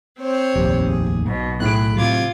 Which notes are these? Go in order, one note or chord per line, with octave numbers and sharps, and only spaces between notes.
C4 C5 C#5
F1 A#1 D#2 G4
G#4
B1 B2
A2 G#4 B5 F#6 D7
C3 F#3 F4 D6 G#6